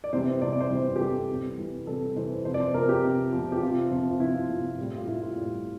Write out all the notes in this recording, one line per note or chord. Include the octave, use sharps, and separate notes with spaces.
D5
C3 E3 G3 C5
C3 E3 G3 D5
D5
C5
C3 E3 G3
G4
C3 E3 G3 A4
C3 E3 G3
C3 E3 G3
C3 E3 G3 A4
C3 E3 G3 C5
C3 F3 C5
D5
C5
C3 F3 A#4
G4
C3 F3
C3 F3
G4
C3 F3 F4
C3 F3
F4
C3 F3 E4
F4
C3 F3
A2 G3
F4
A2 G3 E4
F4
A2 G3